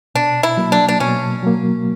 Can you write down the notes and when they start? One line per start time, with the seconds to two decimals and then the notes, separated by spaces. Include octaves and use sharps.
0.15 B2 D4
0.43 E4
0.57 F#3 A#3
0.72 D4
0.88 D4
1.00 B2 C#4
1.43 F#3 A#3